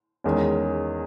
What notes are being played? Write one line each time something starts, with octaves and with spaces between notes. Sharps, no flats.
E2 D#3 G#3 C#4